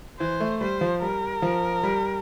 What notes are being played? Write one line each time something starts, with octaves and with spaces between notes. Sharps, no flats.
E3 C5
A3
G3 C5
F3
G3 A#4
F3
G3